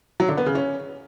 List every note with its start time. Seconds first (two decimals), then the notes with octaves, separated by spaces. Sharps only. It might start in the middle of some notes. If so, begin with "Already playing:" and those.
0.20 F#3
0.29 D3
0.37 B3
0.46 C#3
0.55 C#4